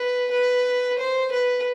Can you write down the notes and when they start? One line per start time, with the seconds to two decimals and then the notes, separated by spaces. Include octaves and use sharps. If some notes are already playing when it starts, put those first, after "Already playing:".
Already playing: B4
0.31 B4
0.98 C5
1.32 B4